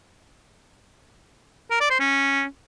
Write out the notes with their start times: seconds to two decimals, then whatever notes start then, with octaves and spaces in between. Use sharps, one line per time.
1.71 A#4
1.80 D5
1.90 C5
2.00 C#4